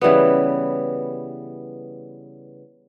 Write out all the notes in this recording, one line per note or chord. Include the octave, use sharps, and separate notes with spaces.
C#3 E3 G3 B3